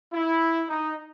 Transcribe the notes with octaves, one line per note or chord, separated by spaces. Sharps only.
E4
D#4